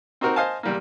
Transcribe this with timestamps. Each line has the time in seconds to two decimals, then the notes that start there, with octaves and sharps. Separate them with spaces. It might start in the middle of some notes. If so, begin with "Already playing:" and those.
0.21 C4 D#4 F#4 A#4
0.36 C5 D#5 F5 G#5 A5
0.63 E2 G3 A#3